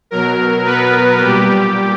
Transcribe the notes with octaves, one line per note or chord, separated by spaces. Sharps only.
B2 F#3 A#4
B3 B4
A#2 G3 G4